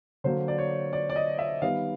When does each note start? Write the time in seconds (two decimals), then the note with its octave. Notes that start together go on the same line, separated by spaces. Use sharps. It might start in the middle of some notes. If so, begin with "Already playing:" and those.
0.24 D3 F#3 A#3 C5
0.48 D5
0.58 C#5
0.93 D5
1.10 D5
1.16 D#5
1.39 E5
1.62 D#3 G3 B3 F5